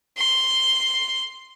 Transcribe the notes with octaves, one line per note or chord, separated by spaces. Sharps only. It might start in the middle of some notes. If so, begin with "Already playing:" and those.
C6